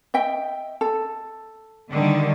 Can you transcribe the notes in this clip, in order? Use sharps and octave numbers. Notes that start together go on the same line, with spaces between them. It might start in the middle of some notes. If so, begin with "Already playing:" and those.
D#5 E5 G5
A4
D3 D#3 G3